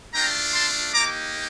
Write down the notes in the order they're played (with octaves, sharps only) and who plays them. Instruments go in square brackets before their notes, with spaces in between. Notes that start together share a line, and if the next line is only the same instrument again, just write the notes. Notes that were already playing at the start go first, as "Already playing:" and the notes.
[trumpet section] A3 D4 F4 G5 A#5
A5 C6
A#3 D#4 G4 A#5 D6